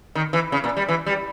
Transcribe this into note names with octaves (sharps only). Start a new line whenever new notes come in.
D#3
E3
C#3
A#2
G3
E3
G3